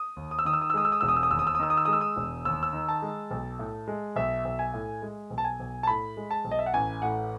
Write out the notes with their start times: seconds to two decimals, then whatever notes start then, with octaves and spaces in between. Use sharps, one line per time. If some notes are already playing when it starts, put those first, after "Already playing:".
Already playing: D#6
0.16 D#2
0.31 D#6
0.39 E6
0.45 D#3 D#6
0.54 E6
0.62 D#6
0.70 E6
0.74 G#3 D#6
0.85 E6
0.92 D#6
1.01 E1 E6
1.08 D#6
1.16 E6
1.23 D#6
1.31 D#2 E6
1.39 D#6
1.47 E6
1.55 D#6
1.60 D#3 E6
1.70 D#6
1.77 E6
1.85 G#3 D#6
1.93 E6
2.01 D#6
2.17 E1
2.45 D#2 E6
2.63 E6
2.73 D#3
2.89 A5
3.02 G#3
3.31 B1
3.59 A2
3.88 G#3
4.16 B1 E5
4.45 B1
4.59 G#5
4.74 A2
5.02 G#3
5.30 B1
5.38 A5
5.44 G#5
5.60 B1
5.83 A5
5.87 A2 B5
6.17 G#3
6.31 A5
6.45 B1
6.51 D#5
6.59 E5
6.66 F#5
6.74 A1 G#5
7.02 A2 F#5